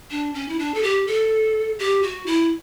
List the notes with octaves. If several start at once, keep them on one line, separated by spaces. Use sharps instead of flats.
D4
C#4
E4
D4
A4
G4
A4
G4
F#4
E4